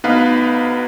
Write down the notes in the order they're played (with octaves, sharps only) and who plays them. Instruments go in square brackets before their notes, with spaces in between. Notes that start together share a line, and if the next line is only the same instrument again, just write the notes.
[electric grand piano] D2 B3 D#4 B4 F5